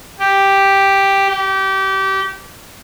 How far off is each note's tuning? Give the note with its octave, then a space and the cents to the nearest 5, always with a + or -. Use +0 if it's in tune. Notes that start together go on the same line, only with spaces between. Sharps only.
G4 +0
G4 -25